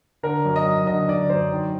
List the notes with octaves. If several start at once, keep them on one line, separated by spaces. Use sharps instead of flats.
D3 A#4
F#2
D#5
F#2
D3 D#5
D3 D5
F#2 C5
D#3